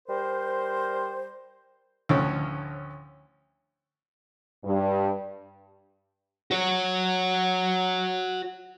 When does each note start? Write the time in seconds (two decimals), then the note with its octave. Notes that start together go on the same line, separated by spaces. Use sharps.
0.09 G3 A#4 C5
2.09 D2 A2 F3 C#4
4.65 G2
6.51 F#4 C#5